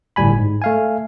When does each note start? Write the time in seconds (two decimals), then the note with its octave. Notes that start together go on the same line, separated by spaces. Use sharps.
0.16 G1 A2 G3 G#5 B5
0.38 G#2
0.62 A3 F5 G#5